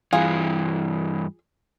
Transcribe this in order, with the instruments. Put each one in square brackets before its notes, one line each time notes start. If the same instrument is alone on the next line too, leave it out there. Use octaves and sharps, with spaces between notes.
[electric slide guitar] G2 E3 [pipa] F4 G#4